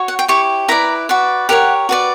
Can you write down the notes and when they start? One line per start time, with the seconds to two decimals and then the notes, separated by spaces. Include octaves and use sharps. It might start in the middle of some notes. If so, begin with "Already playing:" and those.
Already playing: F#4 C#5
0.08 F#5
0.19 G5
0.28 E4 G4 C#5 C#6
0.68 E4 B4 D5 A#5
1.09 F#4 B4 D5
1.49 G4 A#4 C#5 F#5
1.89 F#4 B4 D5